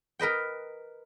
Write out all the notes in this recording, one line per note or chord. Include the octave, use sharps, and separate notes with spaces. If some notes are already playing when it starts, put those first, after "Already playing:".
A#4 B4 D#5 G5